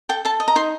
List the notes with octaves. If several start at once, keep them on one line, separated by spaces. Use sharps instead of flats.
A4 G5
A4 A5
D#5
A#5
D#4 C6